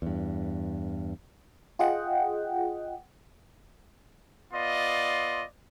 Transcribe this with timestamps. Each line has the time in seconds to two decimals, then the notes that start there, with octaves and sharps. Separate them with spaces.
0.02 E2 G2
1.79 F4 G#4 D#5 F#5 G5
4.53 B3 F4 D5 D#5 C6